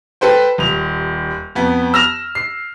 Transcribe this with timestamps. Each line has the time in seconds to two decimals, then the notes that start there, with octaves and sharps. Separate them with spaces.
0.21 A4 B4 C5 G5
0.58 D#1 F7
1.55 F2 B3
1.94 E6 F6 A#6 E7 F7
2.35 C7